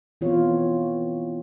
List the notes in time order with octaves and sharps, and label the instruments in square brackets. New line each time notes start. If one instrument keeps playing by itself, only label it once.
[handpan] E3 B3 C4 F4 C#5